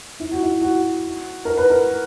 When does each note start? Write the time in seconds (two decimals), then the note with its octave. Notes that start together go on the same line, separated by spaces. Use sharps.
0.20 E4
0.31 F#4
0.42 E4
0.62 F#4
1.45 A#4
1.58 B4
1.70 A#4